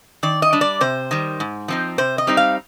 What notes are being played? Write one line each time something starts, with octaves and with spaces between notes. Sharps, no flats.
D#3 D5
D#5
G3 D4
D5
C3 C5
D#3 G3
G#2
F3 C4 D#4
C3 C5
D#5
G3 C4 D#4
F5